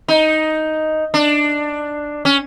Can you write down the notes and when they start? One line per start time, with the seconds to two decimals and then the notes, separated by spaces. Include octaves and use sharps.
0.08 D#4
1.14 D4
2.25 C#4